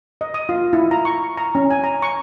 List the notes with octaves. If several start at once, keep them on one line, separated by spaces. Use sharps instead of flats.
D#5
D#6
F4
E4
A#5
C#6
A#5
C#4
G#5
A#5
C#6